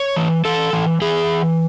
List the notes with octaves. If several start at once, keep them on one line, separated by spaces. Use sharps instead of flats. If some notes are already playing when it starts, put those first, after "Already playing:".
Already playing: C#5
E3
E3 A4
E3
E3 G#4